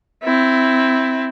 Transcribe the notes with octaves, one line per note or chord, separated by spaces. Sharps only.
C4 E4